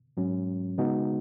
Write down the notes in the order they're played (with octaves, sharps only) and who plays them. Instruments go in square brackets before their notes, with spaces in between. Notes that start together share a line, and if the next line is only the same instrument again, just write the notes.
[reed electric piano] G#2 F#3 C#4
C#3 G#3 B3 D#4 F#4